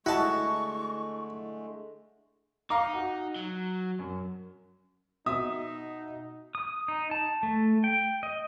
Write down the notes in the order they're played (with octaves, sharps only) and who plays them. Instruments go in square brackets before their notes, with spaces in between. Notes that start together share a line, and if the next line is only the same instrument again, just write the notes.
[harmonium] D3 G#3 A3 [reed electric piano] E4 D#5 [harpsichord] F#4 A5 [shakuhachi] C#6
[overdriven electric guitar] D#4 [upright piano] F5 A#5 D6
[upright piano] F#4
[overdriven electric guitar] F#3
[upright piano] F#2
[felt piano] B2 [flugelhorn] D#4 [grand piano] E5 [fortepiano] D#6
[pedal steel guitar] D#6
D#4
A5
A3
G5
D#5